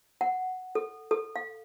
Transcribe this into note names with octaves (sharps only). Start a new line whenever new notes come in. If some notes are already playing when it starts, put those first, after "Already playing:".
F#5
A4
A4
F5